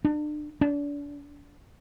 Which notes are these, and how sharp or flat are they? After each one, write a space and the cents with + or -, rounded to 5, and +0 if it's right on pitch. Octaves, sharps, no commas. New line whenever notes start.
D4 +35
D4 -35